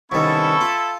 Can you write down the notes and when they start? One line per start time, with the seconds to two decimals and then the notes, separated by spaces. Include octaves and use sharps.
0.12 C2 D#3 B3 C#4 E4 A4 C#6
0.61 F4